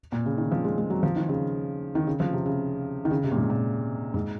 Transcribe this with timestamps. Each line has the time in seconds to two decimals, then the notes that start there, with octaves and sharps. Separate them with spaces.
0.12 A#2
0.26 C#3
0.38 D#3
0.51 F3
0.64 G#3
0.78 G#3
0.90 F#3
1.03 F3
1.16 D#3
1.29 C#3
1.95 D#3
2.07 C#3
2.20 F3
2.33 C3
2.46 C#3
3.05 D#3
3.11 C#3
3.24 C3
3.32 A#2
3.36 G#2
3.50 A#2
4.14 G#2